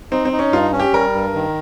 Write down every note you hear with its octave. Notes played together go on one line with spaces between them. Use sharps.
C4 D#4
C4
D#4
C#4
G2 F4
C#4
G4
G3 A#4
G2
D#3